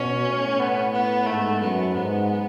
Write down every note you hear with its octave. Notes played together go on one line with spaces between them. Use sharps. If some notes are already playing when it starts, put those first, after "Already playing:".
Already playing: B2 C#4
A2
B3
B3
G#2 A3
F#2 B3
G#2 B3